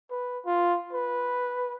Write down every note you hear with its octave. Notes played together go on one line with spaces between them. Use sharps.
B4
F4
B4